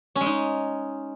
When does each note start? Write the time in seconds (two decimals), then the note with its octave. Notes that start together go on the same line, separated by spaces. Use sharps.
0.15 C#4
0.21 G#3
0.26 D#4